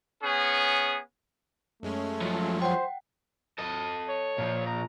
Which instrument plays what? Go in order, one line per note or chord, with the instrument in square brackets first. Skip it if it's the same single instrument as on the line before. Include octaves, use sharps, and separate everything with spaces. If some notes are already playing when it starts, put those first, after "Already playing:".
[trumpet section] B3 C#4 G#4
[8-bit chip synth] F#2 G#3 C#4 [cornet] A3
[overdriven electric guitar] F3 F#3
[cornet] C5 [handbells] F#5 G5
[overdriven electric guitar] A4 D#5
[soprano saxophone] C#5
[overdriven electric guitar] A#2 F3
[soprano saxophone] A#5